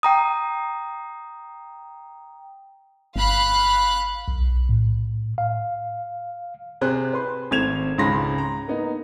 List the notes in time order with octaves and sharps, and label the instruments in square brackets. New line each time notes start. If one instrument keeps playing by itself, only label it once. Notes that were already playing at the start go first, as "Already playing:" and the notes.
[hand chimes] G5 A#5 D#6
[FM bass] G1 [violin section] F5 B5 F#6
[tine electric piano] B1
A2
F5
[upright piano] C3 G#4 C5 F#6
B4 C6
G#1 A3 C4 G#6 E7 F7
C#2 G#2 C#3 B5 C6 A#6
A#5
A#3 B3 D#4